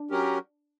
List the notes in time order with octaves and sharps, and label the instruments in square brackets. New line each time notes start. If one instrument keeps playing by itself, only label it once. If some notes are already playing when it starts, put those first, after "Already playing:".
Already playing: [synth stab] D4
[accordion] F#3 C#4 G4 A#4